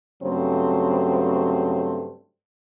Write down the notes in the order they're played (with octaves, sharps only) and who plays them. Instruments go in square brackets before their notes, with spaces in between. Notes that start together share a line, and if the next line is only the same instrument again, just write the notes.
[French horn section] G2 C#3 F#3 A3 C4